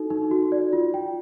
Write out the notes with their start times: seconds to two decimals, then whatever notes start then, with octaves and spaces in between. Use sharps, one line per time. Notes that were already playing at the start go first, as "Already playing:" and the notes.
Already playing: D#4 F#4 A4
0.10 D#4
0.31 F#4
0.52 D5
0.73 F4
0.94 G5